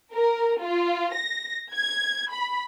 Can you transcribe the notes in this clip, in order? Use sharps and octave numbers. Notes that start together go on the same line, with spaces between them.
A#4
F4
A#6
G#6
B5